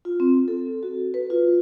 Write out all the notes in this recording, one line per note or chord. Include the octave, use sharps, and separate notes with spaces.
F4
C4
A4
F#4
B4
F4